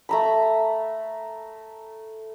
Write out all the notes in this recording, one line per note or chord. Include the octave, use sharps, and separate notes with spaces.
A3 A#5 B5